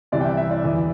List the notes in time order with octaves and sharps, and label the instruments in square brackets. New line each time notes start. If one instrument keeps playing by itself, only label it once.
[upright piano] C2 C3 E3 D5
G5
E5
E5
D5
E1 E2 E3